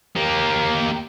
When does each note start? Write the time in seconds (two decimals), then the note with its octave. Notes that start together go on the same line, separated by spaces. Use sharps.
0.16 A#3 G4